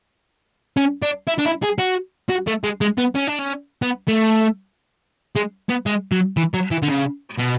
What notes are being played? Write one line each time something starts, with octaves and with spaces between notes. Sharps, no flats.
C#4
D4
E4
D4
E4
G#4
F#4
F#4
A3
G#3
G#3
B3
C#4
D4
C#4
B3
A3
G#3
B3
G#3
F#3
E3
F#3
E3
D3
C#3
B2